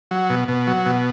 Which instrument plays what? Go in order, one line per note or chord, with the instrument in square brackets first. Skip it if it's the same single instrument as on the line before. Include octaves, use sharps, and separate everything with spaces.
[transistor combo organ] F#3
B2
B2
F#3
B2